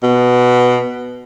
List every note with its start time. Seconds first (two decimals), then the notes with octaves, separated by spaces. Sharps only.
0.03 B2